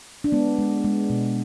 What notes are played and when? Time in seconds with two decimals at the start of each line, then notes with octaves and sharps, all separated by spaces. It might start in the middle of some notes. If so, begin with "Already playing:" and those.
0.24 D4
0.32 G#3 B3
0.58 G#3
0.85 G#3
1.10 B2